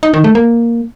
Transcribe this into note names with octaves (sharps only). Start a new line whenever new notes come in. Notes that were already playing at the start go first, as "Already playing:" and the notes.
D#4
D#3
A3
A#3